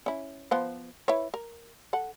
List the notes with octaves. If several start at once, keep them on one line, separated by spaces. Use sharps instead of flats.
C#4 E4
F3 B3 C5
E4 B4 C#5
A#4
A4 F#5